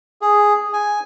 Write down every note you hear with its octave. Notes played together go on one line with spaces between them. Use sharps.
G#4
G#5